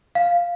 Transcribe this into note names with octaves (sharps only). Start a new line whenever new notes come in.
F5